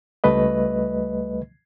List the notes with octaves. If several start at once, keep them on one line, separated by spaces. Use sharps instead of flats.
C#2 G3 A3 B4 D#5